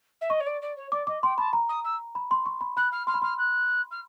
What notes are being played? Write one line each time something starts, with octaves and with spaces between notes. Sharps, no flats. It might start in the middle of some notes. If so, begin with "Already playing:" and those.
E5
D#5 C#6
C#5
D5
D5
C#5
D5 D6
D#5 D6
G5 C6
A5 B5
A#5
D#6
E6
B5
C6
C#6
B5
B5 F#6
F6
C6 F6
B5
C6 F6
F#6
F6